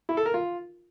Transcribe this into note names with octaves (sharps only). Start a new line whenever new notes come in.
E4
A4
A#4
F4